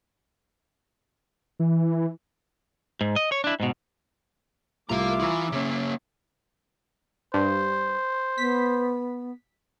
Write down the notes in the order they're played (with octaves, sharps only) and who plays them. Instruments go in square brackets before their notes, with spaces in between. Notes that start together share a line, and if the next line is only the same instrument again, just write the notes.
[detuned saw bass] E3
[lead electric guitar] G#2
D#5
C#5
D4 E4
G#2 B2
[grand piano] C2 G3 A3 [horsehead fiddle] F4 [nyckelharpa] E5 D6 [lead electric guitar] F5 A#5
[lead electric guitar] E3 E4 [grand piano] A#5 C#6 D#6
[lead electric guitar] C#3 A#3 [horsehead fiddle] C#4
[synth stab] G2 [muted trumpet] C5
[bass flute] B3 [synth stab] B6